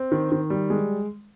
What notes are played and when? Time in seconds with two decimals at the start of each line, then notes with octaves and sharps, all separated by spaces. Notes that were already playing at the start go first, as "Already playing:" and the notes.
Already playing: C4
0.12 D#3
0.31 D#3
0.50 G3
0.70 G#3